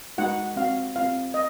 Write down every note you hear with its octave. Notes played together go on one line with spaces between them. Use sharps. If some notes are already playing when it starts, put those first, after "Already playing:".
G#3 D#4 F#4 F#5
C4 F#4 F5
C4 F4 F5
D#5